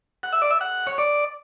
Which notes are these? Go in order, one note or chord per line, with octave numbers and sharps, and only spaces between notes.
F#5
E5
D5
E5
F#5
C#5
D5